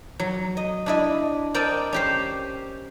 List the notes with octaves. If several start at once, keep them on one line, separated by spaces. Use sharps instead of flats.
F#3
D#5
D4 E4 D#5
C4 A#4 D5 D#5 G5 A5
C#4 G4 C5